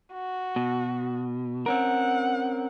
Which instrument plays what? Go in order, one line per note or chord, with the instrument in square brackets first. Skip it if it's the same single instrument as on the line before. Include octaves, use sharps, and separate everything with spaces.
[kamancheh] F#4
[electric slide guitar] B2
[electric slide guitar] C4 C#4 A#4 [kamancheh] F#5